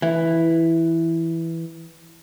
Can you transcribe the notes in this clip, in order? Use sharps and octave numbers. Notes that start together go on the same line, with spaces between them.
E3 E4